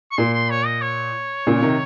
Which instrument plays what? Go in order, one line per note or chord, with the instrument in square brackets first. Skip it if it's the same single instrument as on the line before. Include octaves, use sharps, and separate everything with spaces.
[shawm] C#6
[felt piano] A#2 [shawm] C6
[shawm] C6
C#5
D#5
C#5
[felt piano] A#2 C#3
C3 D#3